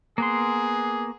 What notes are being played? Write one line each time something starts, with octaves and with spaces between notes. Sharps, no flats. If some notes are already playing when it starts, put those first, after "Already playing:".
A#3 B3 G#4 C6